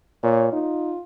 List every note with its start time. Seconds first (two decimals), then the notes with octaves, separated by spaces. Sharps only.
0.23 A#2 C#5
0.52 D#4 F4